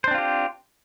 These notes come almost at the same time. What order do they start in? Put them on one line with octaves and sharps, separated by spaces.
C5 D4 C4 F4 G4